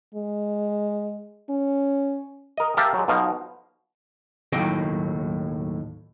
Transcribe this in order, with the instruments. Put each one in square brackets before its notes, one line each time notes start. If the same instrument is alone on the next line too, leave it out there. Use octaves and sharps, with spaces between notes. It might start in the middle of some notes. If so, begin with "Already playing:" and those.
[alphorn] G#3
C#4
[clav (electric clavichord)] A#4 D#5
G4 A#4 E5 F5 A5
F#3 G#3
B1 B2 F3 F5 A#5
[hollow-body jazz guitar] D#2 A2 D#3 F#3 D#5 G5